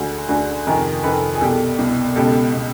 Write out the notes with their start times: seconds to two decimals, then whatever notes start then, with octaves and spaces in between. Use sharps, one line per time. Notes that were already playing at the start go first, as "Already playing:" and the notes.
Already playing: D2 D3 F#4 G#4
0.28 D2 D3 F#4 G#4
0.67 F2 C3 D#3 G#4 A#4
1.03 F2 C3 D#3 A4 B4
1.35 G#4
1.41 C2 B2 G4 A4
1.78 C2 B2
2.16 C#2 B2 G4 A4
2.54 B2